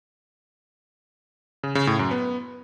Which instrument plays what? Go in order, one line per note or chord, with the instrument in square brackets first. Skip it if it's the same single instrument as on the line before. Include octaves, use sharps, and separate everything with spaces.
[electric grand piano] C#3
C#3
A2
F#2
B3